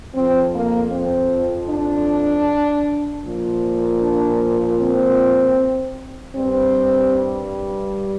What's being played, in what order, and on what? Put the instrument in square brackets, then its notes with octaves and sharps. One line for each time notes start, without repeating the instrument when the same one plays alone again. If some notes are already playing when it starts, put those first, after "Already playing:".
[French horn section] F2 F3 C4
A#3
C4
D4
A#2 F3
D4
C4
G2 G3 C4